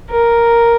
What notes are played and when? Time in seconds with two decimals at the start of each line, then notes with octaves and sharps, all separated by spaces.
0.10 A#4